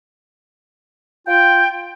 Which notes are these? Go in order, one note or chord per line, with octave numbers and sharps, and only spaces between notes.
F4 G5